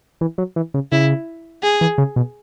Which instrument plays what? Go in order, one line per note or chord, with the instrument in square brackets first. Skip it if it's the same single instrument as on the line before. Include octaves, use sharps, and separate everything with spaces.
[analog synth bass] E3
F#3
E3
C#3
[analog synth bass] C#3 [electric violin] E4
[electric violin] G#4
[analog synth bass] E3
C#3
B2